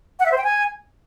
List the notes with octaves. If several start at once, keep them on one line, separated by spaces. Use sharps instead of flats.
F#5
E5
C5
G5
G#5